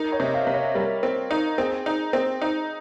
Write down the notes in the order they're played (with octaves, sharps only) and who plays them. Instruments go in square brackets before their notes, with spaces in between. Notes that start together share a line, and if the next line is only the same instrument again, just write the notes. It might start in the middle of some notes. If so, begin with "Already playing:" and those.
Already playing: [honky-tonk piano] D#4 [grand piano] A#4
[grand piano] C#5
[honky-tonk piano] C3 [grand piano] D#5
[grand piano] F5
[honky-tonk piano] C3
[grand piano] C#5
[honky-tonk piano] G3 [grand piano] A#4
[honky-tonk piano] C4
D#4
[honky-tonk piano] C4 [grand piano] G#4
[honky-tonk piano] D#4
C4
D#4